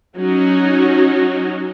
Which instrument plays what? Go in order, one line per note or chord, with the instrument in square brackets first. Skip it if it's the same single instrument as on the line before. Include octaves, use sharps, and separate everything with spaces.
[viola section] F#3 C#4 D#4 F#4